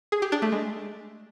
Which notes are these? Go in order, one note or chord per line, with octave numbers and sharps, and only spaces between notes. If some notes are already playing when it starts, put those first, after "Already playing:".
G#4
G4
D4
A3
G#3